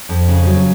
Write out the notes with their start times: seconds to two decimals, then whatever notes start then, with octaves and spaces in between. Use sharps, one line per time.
0.09 F2
0.28 C#3
0.47 F#3